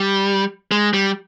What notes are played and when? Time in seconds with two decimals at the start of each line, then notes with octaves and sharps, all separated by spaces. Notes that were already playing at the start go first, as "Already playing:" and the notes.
Already playing: G3
0.72 G#3
0.94 G3